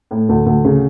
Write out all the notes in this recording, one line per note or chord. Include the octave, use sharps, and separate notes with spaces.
A2
D2
D2
C#3